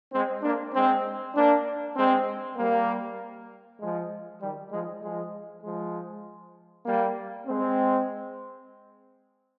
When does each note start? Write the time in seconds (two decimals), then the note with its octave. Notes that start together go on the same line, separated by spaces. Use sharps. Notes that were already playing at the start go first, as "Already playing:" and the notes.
0.13 G#3 C4
0.43 A#3 D4
0.74 G#3 C4
1.35 A#3 D4
1.96 G#3 C4
2.57 G3 A#3
3.80 F3 G#3
4.41 D#3 G3
4.71 F3 G#3
5.02 F3 G#3
5.63 F3 G#3
6.86 G3 A#3
7.47 G#3 C4